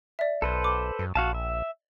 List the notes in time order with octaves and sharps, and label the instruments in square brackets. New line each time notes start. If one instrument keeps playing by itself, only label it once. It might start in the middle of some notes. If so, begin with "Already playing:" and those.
[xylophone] D5 E5
[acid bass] B1 [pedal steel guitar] A4 B4 C5
[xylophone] D6
[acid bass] F#2
[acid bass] A#1 [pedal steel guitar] F#4 F5 A5
[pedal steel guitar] E5